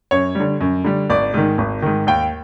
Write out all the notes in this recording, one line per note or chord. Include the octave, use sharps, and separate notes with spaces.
F#2 C#5
D3 G3
F#2
D3 G3
G#1 D5
G#2 D#3
G#1
G#2 D#3
D#2 G5